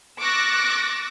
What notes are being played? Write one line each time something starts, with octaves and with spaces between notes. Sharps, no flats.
C#6 D6 E6 F#6 A6 A#6